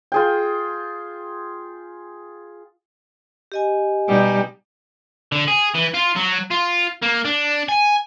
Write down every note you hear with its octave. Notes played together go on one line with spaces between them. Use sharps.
F4 G#4 G5
G4 D#5 G#5
B2 G3 D#4
D3
G#4
E3
F4
F#3
F4
A#3
D4
G#5